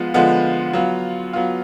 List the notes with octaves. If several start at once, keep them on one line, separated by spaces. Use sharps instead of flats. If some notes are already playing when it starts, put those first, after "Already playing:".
Already playing: F3 G#3 B3 F4
D3 F3 G#3 B3 F4
F#3 B3 F4
F#3 B3 F4